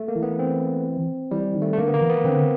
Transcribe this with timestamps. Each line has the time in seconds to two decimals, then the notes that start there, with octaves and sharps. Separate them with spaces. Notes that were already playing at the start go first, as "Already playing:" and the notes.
Already playing: A3
0.08 A#3
0.16 E3
0.23 B3
0.39 C4
1.31 E3 G3
1.55 D#3
1.62 A3
1.73 A3
1.78 D3 A#3
1.88 B3
1.94 A#3
2.01 E3
2.10 B3
2.24 D3 C4